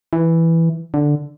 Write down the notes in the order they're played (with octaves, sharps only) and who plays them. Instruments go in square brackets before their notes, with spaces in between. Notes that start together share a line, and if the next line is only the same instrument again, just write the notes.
[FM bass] E3
D3